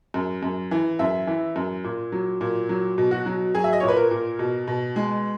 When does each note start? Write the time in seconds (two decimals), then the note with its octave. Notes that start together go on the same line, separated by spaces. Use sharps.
0.14 F#2
0.43 F#2
0.71 E3
0.99 F#2 E5
1.27 E3
1.56 F#2
1.84 A#2
2.12 F#3
2.41 A#2
2.69 F#3
2.98 B2
3.11 F#4
3.26 F#3
3.55 F#3 G#4
3.64 E5
3.73 D#5
3.80 A#2 C#5
3.88 B4
3.96 A#4
4.11 A#2
4.39 B2
4.68 B2
4.96 G#3